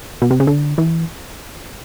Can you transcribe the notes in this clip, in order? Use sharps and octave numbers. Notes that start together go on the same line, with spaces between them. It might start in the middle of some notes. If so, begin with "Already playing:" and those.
B2
C3
C#3
D3
E3